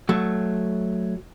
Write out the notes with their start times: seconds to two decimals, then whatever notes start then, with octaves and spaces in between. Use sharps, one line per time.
0.09 F#3 A3